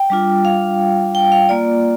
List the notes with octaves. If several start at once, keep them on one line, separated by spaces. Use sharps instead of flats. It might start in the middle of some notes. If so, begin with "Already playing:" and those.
Already playing: G5
G3 D4 F4
F5
G5
F5
A#3 F4 D5